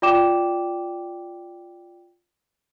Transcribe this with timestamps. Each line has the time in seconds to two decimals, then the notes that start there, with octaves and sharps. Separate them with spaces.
0.02 F4 D5 G5 D6 E7